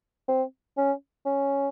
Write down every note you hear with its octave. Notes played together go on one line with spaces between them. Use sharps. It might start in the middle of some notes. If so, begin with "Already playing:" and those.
C4
C#4
C#4